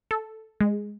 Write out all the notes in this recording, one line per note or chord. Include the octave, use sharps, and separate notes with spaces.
A4
G#3